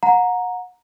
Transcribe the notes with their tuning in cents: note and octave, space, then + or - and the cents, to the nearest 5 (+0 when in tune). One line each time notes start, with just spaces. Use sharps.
F#5 -35 A#5 +0